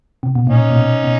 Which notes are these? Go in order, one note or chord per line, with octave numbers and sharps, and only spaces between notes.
C3
B2
A#2 C#4 D#4
A#2
B2
B2